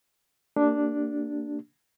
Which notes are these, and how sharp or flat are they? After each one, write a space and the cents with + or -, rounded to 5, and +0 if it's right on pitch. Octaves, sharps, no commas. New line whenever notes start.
A#3 -25 D4 +0 G4 -15